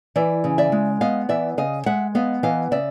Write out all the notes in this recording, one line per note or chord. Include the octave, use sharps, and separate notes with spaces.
E3 D5 E5
C#3
D5 E5
G#3
B3 D#5 F5
E3 D5 E5
C#3 D#5 F5
G#3 E5 F#5
B3 D#5 F5
E3 D#5 F5
C#3 D5 E5